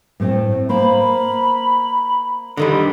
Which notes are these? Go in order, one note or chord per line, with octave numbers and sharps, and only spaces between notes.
A2 A3 C4
A#3 C5 B5
D3 D#3 G3